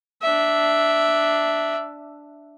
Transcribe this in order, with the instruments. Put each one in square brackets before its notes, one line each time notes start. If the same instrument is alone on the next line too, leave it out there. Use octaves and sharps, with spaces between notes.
[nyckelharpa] D4 E5